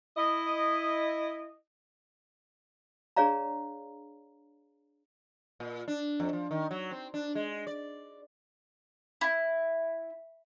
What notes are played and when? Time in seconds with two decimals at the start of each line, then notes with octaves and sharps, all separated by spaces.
0.17 E4 D#5
3.16 D4 G#4 C#5 D5 F5 A#5
5.60 A#2
5.88 D4
6.20 F2
6.33 F3
6.51 D#3
6.71 F#3
6.91 C4
7.14 D4
7.35 G#3
7.67 D5
9.21 E4